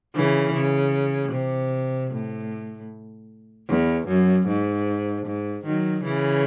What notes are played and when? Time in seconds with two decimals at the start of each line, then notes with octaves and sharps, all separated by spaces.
0.15 C#3 E3
0.54 C#3
1.32 C3
2.11 A2
3.68 E2
4.07 F#2
4.47 G#2
5.26 G#2
5.65 D#3 F#3
6.04 C#3 E3